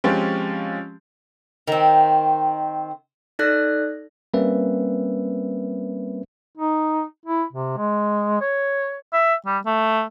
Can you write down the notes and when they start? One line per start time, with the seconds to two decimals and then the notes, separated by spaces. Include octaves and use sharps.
0.04 F3 G#3 C4 C#4 F4 G4
1.68 D#3 C4
3.39 D#4 A4 D5 F#6 A#6
4.34 G3 A#3 C4 C#4 B4 E5
6.57 D#4
7.25 E4
7.52 C3
7.77 G#3
8.41 C#5
9.13 E5
9.46 G3
9.66 A3